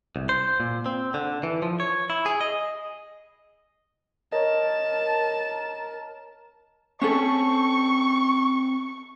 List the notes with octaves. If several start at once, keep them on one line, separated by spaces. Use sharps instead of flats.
C2
C5
A#2
C4
D3
E3
F3
C#5
E4
G#4
D#5
A#4 C#5 D#5 A5
C4 C#4 A4 C5 C#5 C#6